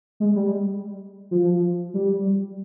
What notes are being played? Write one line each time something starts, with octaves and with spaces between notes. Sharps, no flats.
G#3
G3
F3
G3